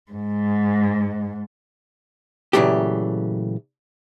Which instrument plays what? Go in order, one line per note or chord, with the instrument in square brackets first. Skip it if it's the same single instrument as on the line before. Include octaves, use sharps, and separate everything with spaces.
[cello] G#2
[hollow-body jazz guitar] A#2 C#3 E3 F#3 A3 G4